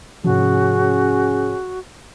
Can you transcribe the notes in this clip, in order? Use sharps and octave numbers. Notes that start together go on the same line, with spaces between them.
G#2 C3 F3 C#4 F#4 G#4